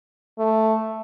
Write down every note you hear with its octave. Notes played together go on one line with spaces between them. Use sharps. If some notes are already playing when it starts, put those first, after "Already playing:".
A3